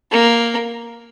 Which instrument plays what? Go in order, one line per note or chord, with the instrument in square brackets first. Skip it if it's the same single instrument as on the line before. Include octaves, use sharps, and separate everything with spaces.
[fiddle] A#3